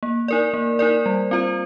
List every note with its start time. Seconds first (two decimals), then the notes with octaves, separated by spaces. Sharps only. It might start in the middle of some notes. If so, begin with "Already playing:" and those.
0.03 A#3
0.28 D#4 A#4 D5
0.54 A#3
0.79 D#4 A#4 D5
1.06 G3
1.31 C4 F4 C5